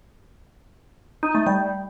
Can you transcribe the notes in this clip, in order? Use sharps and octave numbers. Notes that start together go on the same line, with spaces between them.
D#4
A3
G3